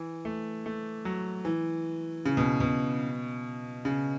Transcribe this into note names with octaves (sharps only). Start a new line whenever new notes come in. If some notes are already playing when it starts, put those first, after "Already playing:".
Already playing: E3
A3
A3
F#3
E3
C#3
B2
B2
C#3